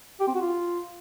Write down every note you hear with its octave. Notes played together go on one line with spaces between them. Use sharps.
G4
C4
F#4
F4